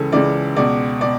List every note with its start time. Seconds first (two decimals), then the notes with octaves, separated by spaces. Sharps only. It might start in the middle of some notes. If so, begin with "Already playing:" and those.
Already playing: C#2 C#3 E3 G#4 A4
0.12 C#2 C#3 E3 D5
0.56 C#2 B2 D5
1.01 B2 D5